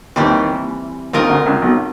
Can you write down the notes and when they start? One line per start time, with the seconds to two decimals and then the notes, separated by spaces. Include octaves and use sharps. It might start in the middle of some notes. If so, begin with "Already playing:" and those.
0.16 D#2 D#3 E3 G3 C4
1.13 D#2 D#3 C4 F4 A#4 D#5
1.30 D2 D3
1.46 C#2 C#3
1.61 B1 B2